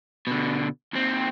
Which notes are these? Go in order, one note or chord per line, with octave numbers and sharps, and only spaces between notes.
B2 D3
D#2 C4